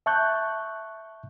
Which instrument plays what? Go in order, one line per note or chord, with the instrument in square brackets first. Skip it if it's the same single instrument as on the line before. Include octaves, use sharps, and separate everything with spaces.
[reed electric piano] E5 A5 C#6 F#6 G6